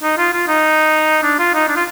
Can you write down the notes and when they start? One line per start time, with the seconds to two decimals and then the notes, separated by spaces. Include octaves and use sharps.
0.03 D#4
0.18 F4
0.33 F4
0.48 D#4
1.23 D4
1.39 F4
1.54 D#4
1.68 D4
1.76 F4